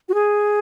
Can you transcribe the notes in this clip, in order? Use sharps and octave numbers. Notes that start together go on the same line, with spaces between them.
F#4
G#4